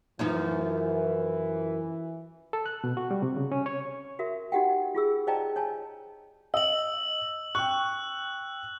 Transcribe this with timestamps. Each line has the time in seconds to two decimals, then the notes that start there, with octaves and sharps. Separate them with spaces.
0.19 F#2 E3 F3 D#4
2.53 A4
2.66 F#6
2.84 B2
2.97 F#4
3.11 G3
3.22 C3
3.36 C#3
3.52 C#4
3.66 C#5
4.19 F#4 A#4 E5
4.52 D#4 F#4 G4 F#5 G5
4.95 F4 G#4 E6
5.27 C5 D5 D#5 G5 A5 A#5
5.56 C#5 G#5 A5
6.54 D#5 E6 F#7
7.55 G5 C#6 F#6